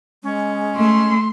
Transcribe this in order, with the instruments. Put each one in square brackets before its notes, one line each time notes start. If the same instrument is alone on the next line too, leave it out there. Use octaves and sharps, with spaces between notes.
[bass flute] G#3 [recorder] C#4
[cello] A3 [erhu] C6